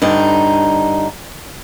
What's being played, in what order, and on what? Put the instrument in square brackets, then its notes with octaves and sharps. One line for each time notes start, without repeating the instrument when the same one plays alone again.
[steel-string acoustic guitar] G2 D3 D#4